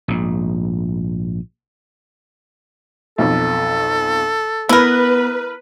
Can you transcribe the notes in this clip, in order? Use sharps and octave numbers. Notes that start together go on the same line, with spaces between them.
A#1 G#2
B1 F2 A4
B3 E4 A#4 B4